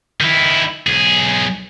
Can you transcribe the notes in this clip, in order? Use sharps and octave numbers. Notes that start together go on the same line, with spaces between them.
D#3 E4
B1 G#4